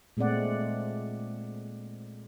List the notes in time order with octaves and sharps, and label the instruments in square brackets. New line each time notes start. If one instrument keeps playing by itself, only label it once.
[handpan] A#2 G#3 A3 C4 D5 F#5